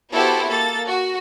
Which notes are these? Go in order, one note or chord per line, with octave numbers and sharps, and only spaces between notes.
B3 E4 F#4 G4 A4 C5
A#3 A4 A6
F#4